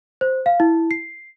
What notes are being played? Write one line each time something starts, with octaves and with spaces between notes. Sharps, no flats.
C5
F5
E4
C7